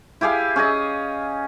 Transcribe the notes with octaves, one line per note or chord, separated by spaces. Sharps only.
E4 G4 G#4 F5
C#4 G#4 D#5